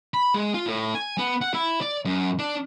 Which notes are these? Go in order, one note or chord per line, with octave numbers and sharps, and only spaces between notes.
B5
G#3
F4
A2
G#5
B3
F#5
E4
D5
F#2
D4